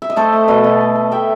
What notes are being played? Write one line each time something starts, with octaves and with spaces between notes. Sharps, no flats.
E5
D#5
A3 A4 C5
A3
B2 B4 D#5
B2
A3
A3
A3 E5 G5